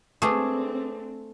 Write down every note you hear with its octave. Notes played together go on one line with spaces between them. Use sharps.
A3 C4 D4 G#4 B4 D6 D#6